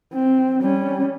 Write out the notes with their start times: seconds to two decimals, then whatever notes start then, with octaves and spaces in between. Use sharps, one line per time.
0.14 C4
0.61 G3 C#4